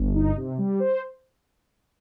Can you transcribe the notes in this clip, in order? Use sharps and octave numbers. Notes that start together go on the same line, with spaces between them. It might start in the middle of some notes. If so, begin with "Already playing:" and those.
Already playing: G1
D#4
C3
G3
C5